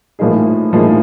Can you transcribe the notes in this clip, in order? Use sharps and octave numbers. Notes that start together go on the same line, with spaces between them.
A2 F3 A#3 D#4 G#4
A2 F3 A#3 D#4 G#4